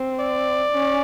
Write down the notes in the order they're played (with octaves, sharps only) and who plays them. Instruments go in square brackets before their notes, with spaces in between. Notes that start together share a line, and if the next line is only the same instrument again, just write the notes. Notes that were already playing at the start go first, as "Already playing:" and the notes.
Already playing: [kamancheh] C4
[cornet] D5
[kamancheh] C#4